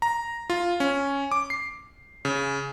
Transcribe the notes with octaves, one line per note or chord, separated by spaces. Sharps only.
A#5
F4
C#4
D6
C7
C#3